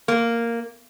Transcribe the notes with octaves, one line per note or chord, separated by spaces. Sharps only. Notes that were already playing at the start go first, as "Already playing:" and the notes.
A#3